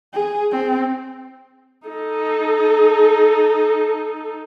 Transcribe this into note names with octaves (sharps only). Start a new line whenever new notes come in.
G#4
C4
D#4 A4